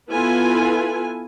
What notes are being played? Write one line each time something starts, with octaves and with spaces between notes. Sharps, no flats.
B3 E4 F4 A4 B4 G#5